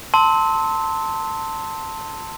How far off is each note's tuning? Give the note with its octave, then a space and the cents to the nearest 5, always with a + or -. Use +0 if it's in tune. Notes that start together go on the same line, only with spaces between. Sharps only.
A5 +20 C6 +0 E6 -30